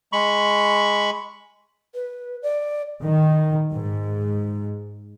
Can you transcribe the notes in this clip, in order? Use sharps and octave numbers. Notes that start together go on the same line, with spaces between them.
G#3 B5 C#6
B4
D5
D#3
G#2